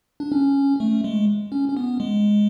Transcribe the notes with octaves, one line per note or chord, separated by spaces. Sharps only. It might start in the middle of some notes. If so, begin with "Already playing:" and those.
D4
C#4
A3
G#3
C#4
C#4
B3
G#3